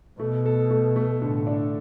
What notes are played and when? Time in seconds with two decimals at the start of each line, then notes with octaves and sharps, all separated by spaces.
0.19 B2 A3
0.45 A4
0.71 A3
0.96 A3
1.21 A2 D3
1.47 D4